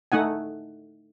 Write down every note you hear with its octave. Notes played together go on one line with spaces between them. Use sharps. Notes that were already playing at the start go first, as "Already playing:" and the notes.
A3 D#4 F#5 G#5